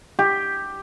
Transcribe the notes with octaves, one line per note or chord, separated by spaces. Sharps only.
G4